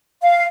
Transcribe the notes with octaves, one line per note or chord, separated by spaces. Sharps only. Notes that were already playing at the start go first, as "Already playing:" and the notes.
F5